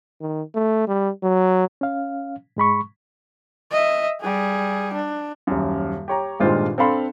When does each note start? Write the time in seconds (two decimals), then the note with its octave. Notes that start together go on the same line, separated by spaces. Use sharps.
0.21 D#3
0.55 A3
0.88 G3
1.23 F#3
1.81 C#4 F5
2.57 G#2 G#3 B5 C#6
3.71 D#5 E5
4.21 G3 G#4
4.94 D4
5.47 D#1 F#2
6.08 G4 C#5 A#5
6.40 G#1 G2 A#2 G#3 F4 C5
6.78 C4 D4 A4 F5 B5 C6